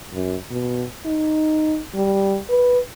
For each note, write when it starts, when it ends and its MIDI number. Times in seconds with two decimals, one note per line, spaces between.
0.13 0.36 42
0.50 0.84 47
1.05 1.78 63
1.95 2.38 55
2.49 2.79 71